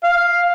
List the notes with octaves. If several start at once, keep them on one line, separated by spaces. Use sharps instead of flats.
F5